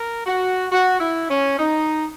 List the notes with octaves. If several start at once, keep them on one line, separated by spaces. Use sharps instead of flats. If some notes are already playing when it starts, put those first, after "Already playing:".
Already playing: A#4
F#4
F#4
E4
C#4
D#4